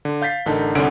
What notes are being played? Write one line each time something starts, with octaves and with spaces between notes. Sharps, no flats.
D3
F5 G6 A6 B6 C7
A1 D3 D#4 A#4 A5
G1 C2 D3 C#4 F#5 D7